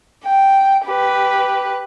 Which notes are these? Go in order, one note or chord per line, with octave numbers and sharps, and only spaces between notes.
G5
G4 B4